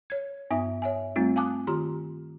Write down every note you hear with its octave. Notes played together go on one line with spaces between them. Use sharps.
C#5 G#6
G2 B3 D#4 E5 D#6
C#5 E5 G#5
G3 A3 C4 D#4 F4
F5 G#5 A5 D6 D#6 F#6
D#3 F4 G4 A#5 C6